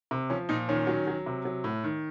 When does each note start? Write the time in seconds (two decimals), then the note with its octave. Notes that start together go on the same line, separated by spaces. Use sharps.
0.11 C3
0.30 F3 C#4
0.49 A#2 D#4
0.69 D#3 C#4
0.87 F#3
1.07 F#3
1.26 C3
1.45 F#3
1.64 A2
1.84 D#3